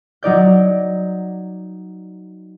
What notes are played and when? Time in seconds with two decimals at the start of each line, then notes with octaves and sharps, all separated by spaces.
0.23 F#3 D#4 D5 G6